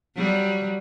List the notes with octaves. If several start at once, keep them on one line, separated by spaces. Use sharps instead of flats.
F#3 G3